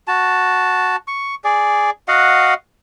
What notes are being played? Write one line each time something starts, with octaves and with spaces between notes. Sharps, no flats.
F#4 A5
C#6
G#4 D5
F#4 D#5 F5 F#5